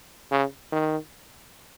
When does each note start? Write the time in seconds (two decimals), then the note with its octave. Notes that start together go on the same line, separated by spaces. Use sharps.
0.32 C#3
0.72 D#3